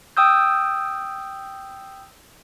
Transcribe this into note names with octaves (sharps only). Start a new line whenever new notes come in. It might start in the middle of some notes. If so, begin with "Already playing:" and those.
G5 D#6 E6 G6